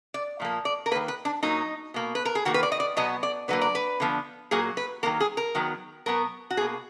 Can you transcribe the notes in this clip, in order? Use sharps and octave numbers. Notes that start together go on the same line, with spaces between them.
D5
A#2 F3 A#3
D5
A#4
D#3 A#3 B4
B4
D4
A#2 F#3 A#3 D#4
B2 A#3
B4
A#4
G#4
D#3 A#3 F#4
B4
D5
D#5
D5
B2 F#3 B3 D#5
D5
D3 F#3 A#3 B4
D5
B4
D3 F3 B3
A#2 F#3 A#3 G#4
B4
D#3 F#3 A#3 A#4
G#4
A#4
D#3 F#3 B3
B2 F#3 B3 A#4
F#4
B2 A#3 G#4